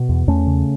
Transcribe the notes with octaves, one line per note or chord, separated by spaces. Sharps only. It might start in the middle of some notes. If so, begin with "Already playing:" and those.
Already playing: B2
E2
E2 A3 C#4
C#3